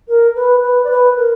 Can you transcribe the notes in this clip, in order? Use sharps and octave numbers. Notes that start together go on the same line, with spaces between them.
A#4
B4
B4
D5
B4
A#4